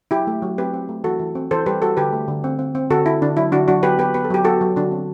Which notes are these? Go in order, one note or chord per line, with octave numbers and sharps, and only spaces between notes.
F#3 E4 G4
A3
F#3
C4 G4 B4
C4
A3
E3 F#4 A4
E3
C4
E3 A4 C5
G3 G4 B4
G3 F#4 A4
D3 G4 B4
A3
D3
C4
C4
C4
D3 F#4 A4
D3 E4
D3 D4
F#3 E4
D3 D4 F#4
F#3 D4 F#4
B3 G4 B4
B3 G4 B4
B3 B4
A4
F#3 G4
B3 F#4 A4
F#3
D3 D4 F#4
C4